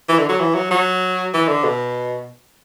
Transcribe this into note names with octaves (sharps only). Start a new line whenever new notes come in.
E3
D3
F#3
E3
F#3
F#3
E3
D3
B2